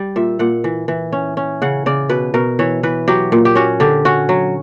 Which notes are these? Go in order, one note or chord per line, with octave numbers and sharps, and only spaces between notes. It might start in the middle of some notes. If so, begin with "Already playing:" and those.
Already playing: G3
A#2 E5
A#2 F#5
E3
E3
C#4
C#4
C#3 F#5
C#3 D5
B2 B4
B2 A#4
E3 C#5
E3 B4
F#3 G4
A#2
G4
C#4 F#4
D3 G4
C#4 F#4
F#3